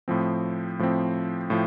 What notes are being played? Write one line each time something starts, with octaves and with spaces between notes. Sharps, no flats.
A2 F3 C4
A2 F3 C4
A2 F3